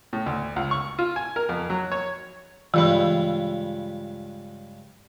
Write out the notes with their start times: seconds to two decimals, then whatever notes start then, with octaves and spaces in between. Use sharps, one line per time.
0.13 A2
0.26 D2
0.56 C#2
0.71 C#6
0.99 F4
1.16 G#5
1.36 A#4
1.49 F2
1.70 F#3
1.92 C#5
2.74 C#2 G2 E3 B4